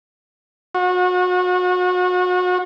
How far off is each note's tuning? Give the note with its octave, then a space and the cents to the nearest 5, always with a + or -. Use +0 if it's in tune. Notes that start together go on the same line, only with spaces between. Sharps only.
F#4 -30